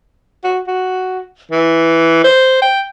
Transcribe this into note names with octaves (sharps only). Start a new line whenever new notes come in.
F#4
F#4
E3
C5
G5